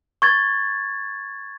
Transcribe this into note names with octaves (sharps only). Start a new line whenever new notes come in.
C#6 G#6 A6